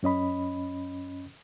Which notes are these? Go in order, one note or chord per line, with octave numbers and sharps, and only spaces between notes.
F#2 C#4 D#5 B5